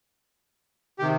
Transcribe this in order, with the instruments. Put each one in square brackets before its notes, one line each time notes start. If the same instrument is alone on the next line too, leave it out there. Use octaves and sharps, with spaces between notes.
[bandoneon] C3 D#3 G4